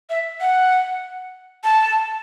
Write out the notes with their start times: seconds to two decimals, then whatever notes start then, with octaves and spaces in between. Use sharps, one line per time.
0.10 E5
0.41 F#5
1.64 A5